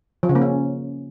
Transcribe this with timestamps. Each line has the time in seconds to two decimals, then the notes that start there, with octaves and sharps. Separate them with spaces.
0.23 F3
0.29 C#3
0.35 A#3
0.41 C#4